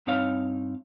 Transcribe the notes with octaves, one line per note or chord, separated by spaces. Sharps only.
G2 C4 D#4 C#5 F5